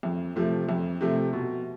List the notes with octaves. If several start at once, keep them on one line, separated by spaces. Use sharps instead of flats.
F2
C3 F3 A3
F2
C3 F3 A3
B2